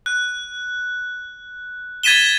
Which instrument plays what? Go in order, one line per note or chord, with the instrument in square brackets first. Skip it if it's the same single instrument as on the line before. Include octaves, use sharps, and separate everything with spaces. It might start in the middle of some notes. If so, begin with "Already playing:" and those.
[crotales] F#6
G#6 A6 B6 D#7 E7 G7